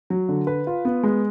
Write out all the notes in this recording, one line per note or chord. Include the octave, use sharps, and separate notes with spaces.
F#3
D3
B4
F4
B3
G#3